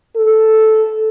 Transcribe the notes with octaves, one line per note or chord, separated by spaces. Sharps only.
A4